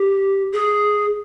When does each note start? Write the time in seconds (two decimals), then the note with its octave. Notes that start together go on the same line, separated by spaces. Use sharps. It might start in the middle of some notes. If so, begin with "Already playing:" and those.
Already playing: G4
0.53 G#4